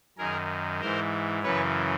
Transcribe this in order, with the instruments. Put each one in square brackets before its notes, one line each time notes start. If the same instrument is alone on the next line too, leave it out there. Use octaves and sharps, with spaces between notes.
[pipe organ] F#2 D#3 G#4 A#4
G#2 E3 A#4 C5
F#2 C#3 E3 B4 C#5